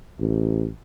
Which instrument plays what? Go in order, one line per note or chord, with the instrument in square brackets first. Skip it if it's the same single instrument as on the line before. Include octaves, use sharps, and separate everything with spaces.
[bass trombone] A1